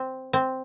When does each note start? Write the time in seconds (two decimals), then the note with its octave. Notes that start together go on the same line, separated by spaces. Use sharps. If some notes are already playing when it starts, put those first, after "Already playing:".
Already playing: C4
0.33 C4